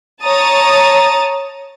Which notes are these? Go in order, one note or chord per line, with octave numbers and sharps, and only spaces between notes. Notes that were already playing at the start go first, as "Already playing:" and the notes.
C#5 A5 A#5 D#6 A6